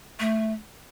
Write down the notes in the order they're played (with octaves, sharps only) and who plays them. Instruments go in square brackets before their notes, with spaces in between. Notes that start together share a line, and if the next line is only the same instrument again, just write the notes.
[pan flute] A3